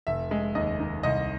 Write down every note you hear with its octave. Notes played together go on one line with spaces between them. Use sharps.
F1 E5
G#3
D#2 D#5
D#3
C2 D#5